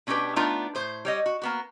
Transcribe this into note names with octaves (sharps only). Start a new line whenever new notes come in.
B2 C#4 D4 F#4 G4 B4
A3 B3 D4 D#4 F4
A2 C5
G3 C#5 D#5
F#4
A#3 B3 F#4